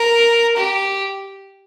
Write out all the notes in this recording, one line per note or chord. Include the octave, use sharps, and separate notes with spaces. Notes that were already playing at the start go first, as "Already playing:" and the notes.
Already playing: A#4
G4